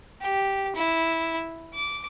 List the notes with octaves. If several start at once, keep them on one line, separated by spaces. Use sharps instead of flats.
G4
E4
D6